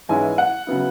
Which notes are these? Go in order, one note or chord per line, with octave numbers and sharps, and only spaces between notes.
G#2 E3 G#3 C#4 E4 G#5
F#5
C#3 F#3 B3 E4